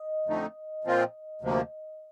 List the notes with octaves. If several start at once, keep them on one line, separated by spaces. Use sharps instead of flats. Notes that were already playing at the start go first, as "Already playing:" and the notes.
Already playing: D#5
F2 D3 A3 D#4
A#2 F3 C4 F4
D2 C3 F3 A#3